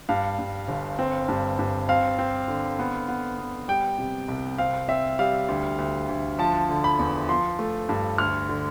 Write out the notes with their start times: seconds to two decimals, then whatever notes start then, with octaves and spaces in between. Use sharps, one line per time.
0.09 G2 F5
0.39 G2
0.68 G1
0.99 C4
1.28 G2
1.59 G2
1.89 C4 F5
2.19 C4
2.48 D3
2.79 B3
3.08 B3
3.38 B3
3.68 G3 G5
3.98 C3
4.28 C2
4.58 C4 F5
4.88 C4 E5
5.19 G3 F5
5.49 D2
5.79 D2
6.09 D2
6.39 F3 A5
6.69 D3
6.84 B5
6.99 E2
7.29 F3 C6
7.59 A3
7.89 G2
8.18 D2 F6
8.49 D3